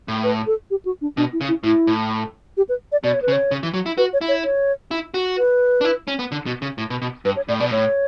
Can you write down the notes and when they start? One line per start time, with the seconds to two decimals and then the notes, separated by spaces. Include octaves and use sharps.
0.08 A2
0.23 B4
0.47 A4
0.70 G4
0.85 F#4
1.01 D4
1.17 B2 D4
1.33 E4
1.41 C#3
1.48 E4
1.64 A2 E4
1.87 A2
2.57 G4
2.69 B4
2.92 D5
3.04 B2 D5
3.13 C#5
3.22 B4
3.28 C#3
3.32 C#5
3.51 C#3
3.63 E3
3.74 F#3
3.86 E4
3.98 F#4 B4
4.13 C#5
4.21 E4
4.28 C#5
4.44 C#5
4.91 E4
5.14 F#4
5.38 B4
5.81 D4
5.85 E4
6.08 C#4
6.19 B3
6.32 D3
6.46 B2
6.62 C#3
6.78 A2
6.90 B2
7.02 B2
7.25 G2 B4
7.36 C#5
7.48 A2 D5
7.60 B2 D5
7.71 A2 C#5